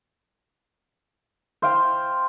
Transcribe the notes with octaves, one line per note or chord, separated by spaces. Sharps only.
C5 E5 F5 G5